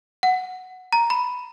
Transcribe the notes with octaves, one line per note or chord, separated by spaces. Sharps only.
F#5
A#5
B5